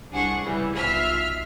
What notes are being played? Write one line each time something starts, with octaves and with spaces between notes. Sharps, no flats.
C2 D4 G#4 F#5 C#6
C#3 E3 G3
B1 F4 E5 F6 B6 C7